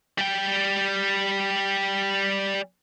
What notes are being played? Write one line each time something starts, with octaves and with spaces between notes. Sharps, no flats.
G3 G5